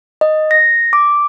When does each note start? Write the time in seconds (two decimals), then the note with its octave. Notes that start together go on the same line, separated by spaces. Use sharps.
0.21 D#5
0.51 A#6
0.93 D6